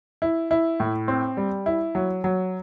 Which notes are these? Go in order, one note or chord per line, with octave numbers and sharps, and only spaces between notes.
E4
E4
A2
C4
G3
E4
F#3
F#3